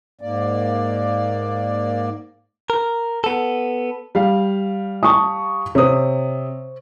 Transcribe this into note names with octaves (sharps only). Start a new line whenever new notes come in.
G#2 A#3 D5
A#4
B3 A4
G3 F5
A5 C#6 D#6
C3 C5 C#5 D#6